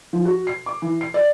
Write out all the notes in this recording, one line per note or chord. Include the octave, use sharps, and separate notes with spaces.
F3
F#4
C7
D6
E3
C7
D5